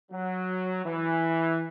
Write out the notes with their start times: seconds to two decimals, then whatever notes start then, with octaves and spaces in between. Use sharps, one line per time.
0.12 F#3
0.85 E3